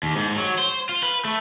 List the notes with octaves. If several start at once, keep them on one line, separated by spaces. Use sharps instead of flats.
D#2
G#2
F#3
C5
F4
B4
A3